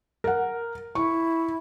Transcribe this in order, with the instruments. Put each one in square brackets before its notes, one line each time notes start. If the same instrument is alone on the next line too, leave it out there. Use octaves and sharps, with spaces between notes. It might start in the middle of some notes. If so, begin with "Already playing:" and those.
[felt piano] A#4 F#5
[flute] E4 [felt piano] C#6